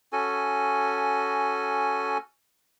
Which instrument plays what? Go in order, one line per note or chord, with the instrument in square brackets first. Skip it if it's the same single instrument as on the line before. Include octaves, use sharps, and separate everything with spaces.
[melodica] C#4 F#4 A4 G#5